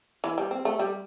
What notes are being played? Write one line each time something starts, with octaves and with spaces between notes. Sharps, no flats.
E3
G3
C4
A3
G3